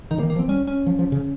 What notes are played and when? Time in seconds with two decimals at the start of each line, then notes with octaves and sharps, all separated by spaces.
0.11 D#3 D#4
0.18 C#3 A#3
0.23 D#3
0.30 A#3
0.36 F3
0.39 C4
0.48 G3 C#4
0.68 C#4
0.86 F3
0.99 F3
1.12 C#3